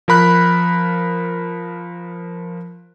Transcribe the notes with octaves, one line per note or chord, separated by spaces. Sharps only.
F3 A#4 B5 F#6